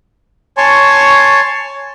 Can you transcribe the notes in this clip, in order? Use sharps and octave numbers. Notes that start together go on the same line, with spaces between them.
C#5 G#5 A5 C6 C#6